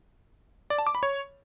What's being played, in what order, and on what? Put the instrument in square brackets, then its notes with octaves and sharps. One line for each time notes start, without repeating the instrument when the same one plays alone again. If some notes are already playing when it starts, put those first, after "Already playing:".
[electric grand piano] D5
A5
D6
B5
C#5